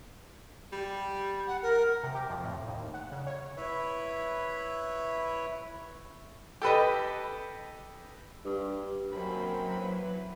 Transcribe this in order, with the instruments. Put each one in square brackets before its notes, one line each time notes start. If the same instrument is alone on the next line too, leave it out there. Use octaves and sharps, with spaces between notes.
[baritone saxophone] G3
[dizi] F#5
A#4
[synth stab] C3
G4
F2
A2
D#2
F#5
C#3
C#5
[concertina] E4 B4 C#5 E5
[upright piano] G4 A4 B4 D#5
[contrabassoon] G2
[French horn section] F#2 [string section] F#3 [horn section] A#3 C4 [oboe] B5
[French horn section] E3 E4 B4